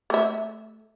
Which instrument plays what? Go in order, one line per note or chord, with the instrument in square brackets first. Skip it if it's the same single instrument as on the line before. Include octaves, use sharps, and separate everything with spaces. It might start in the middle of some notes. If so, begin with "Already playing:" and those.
[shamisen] A3 E5